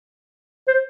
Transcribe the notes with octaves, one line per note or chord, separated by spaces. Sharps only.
C5